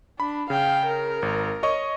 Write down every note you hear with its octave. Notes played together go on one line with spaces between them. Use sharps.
D4 B5
C#3 F5 G5
A#4
G#1
C#5 D#5 C#6